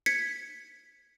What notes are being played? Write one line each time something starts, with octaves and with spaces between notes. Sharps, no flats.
G#6 B6 C#7